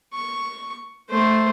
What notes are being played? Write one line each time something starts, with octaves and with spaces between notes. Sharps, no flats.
C#6
A3 C5